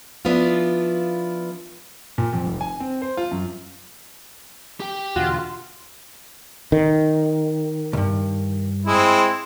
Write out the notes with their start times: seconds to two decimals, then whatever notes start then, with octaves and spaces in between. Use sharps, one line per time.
0.25 F3 B3 D4 E4 F4
2.18 A#2
2.33 F2
2.46 F1
2.61 G#5
2.80 C4
3.02 C5
3.17 F4
3.31 F#2
4.80 G4 G5
5.16 E2 B2 D3 F4 F#4
6.72 D#3
7.93 C#2 G2
8.86 G#3 C4 E4